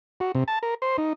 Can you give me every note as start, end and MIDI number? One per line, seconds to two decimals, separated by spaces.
0.20 0.32 66
0.35 0.44 48
0.48 0.59 81
0.63 0.74 70
0.82 0.97 72
0.98 1.13 63